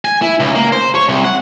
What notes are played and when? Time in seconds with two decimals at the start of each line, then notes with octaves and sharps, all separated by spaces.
0.05 G#5
0.22 E4
0.40 C#2
0.55 A#3
0.72 C5
0.95 C#5
1.09 C2
1.24 F#5